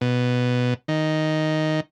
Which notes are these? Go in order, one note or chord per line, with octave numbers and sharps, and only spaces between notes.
B2
D#3